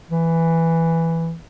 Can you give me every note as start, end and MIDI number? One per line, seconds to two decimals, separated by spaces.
0.10 1.35 52